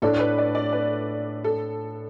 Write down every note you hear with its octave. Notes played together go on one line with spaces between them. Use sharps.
A2 A3 D4 A4
B4
D5
D5
B4
A4